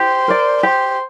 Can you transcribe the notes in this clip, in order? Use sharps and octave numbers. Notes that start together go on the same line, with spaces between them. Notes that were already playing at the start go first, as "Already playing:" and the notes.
Already playing: G4 C5
A#4 D5
G4 C5